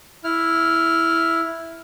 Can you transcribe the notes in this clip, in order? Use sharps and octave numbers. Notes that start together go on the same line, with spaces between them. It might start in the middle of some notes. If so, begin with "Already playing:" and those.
E4 F6